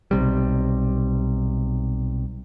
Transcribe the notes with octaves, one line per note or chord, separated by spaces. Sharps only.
B1 C3 G3